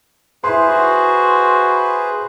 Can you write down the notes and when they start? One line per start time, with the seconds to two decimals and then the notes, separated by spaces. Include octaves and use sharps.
0.44 E4 G#4 B4 C5 C6
0.68 F#4